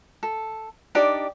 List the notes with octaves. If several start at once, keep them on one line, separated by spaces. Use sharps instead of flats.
A4
D4 D#4 G4 D5